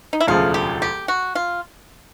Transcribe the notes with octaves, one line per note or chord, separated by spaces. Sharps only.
D#4
E4
E1 D2 C#3 F3 A3 F4
G4
G4
F#4
F4